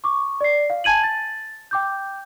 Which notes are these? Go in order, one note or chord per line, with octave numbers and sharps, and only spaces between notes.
C#6 D6
D5 C7
F5
G#5 A5 G#6 D#7 F#7
A6
G5 D6 G6